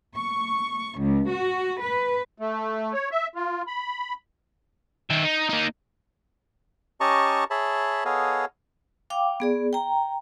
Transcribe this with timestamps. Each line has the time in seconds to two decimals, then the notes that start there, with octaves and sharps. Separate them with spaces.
0.17 C#6
1.00 C#2
1.30 F#4
1.82 B4
2.38 A3
2.93 C#5
3.11 E5
3.35 F4
3.67 B5
5.10 D#3 E5
5.23 D#4
5.49 A#3 D#4
7.00 C#4 G4 D#5 A5 A#5 C#6
7.50 G#4 C#5 E5 A5 B5
8.05 B3 G#4 A4 C#5 D#5 F5
9.10 F5 G5 D6
9.40 B3 G#4 D5
9.73 G5 A#5